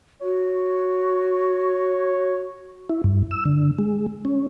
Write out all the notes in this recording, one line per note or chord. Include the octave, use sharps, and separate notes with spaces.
F#4 C#5
E4
G2
E6
D3
G#3
C#4